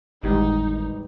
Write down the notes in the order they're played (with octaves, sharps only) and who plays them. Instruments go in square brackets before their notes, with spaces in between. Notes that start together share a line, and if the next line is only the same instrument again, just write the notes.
[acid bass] G#1 [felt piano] E2 G3 [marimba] A2 G#3 G4 [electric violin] D#4